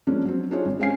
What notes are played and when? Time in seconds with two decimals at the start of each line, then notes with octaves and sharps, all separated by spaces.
0.07 F3 G#3 A#3 C#4 D4
0.25 F#3 C4
0.51 C4 D4 D#4 F4 G#4 C#5
0.65 G#1
0.79 G#3 C4 C#4 F5 G#5 C7